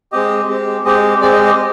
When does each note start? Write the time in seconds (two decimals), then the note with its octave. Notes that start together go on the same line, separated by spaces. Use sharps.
0.12 G#3 C4 G4 D#5
0.49 G#3 C4 G4
0.85 G#3 C4 G4 D#5
1.21 G#3 C4 G4 D5
1.33 D#5
1.46 D#5